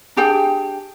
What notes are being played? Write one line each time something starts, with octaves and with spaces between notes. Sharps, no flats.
D4 G4 G#4 G5